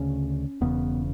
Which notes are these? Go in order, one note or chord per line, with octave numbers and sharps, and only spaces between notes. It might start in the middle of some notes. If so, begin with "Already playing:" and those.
Already playing: D2 C#3 C#4
E1 E2 C#3 B3